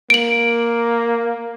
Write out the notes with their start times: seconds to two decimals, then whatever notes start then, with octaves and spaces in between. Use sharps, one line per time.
0.10 A#3 D7 F#7